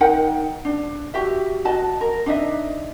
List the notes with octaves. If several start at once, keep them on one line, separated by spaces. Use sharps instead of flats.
D#4 A#4 F#5 G5
D4
F#4 G4 E5
F#4 D#5 A5
A#4
D4 D#4 D#5 E5